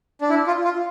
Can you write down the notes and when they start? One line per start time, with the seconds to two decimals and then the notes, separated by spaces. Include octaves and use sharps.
0.21 D4
0.30 E4
0.47 F4
0.64 F4